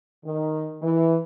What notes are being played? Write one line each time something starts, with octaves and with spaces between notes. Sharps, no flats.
D#3
E3